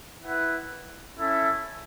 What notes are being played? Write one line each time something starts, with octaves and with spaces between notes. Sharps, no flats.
E4 B4 F#5
C#4 E4 A4 E5